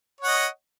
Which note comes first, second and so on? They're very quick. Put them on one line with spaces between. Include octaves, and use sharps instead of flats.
C#5 F#5 D#5